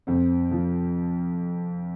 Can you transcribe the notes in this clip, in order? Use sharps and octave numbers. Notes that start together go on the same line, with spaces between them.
F2 C4
F3